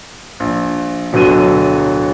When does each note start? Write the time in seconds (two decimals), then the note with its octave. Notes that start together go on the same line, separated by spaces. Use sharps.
0.40 A#1
1.13 D1 B2 D3 F#3 A4 D#7